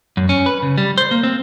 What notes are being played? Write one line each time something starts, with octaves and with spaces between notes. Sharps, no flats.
F#2
C#4
B4
C#3
G3
C5
A#3
C4